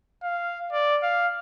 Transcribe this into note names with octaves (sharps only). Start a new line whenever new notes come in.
F5
D5
F5